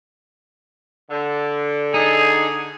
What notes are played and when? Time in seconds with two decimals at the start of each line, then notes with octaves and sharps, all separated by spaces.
1.10 D3
1.94 D#4 G#4